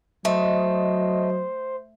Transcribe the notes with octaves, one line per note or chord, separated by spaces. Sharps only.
F#3 A3 C5 D#5